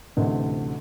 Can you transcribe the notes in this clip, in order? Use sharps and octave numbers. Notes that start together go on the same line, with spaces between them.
A1 D2 C3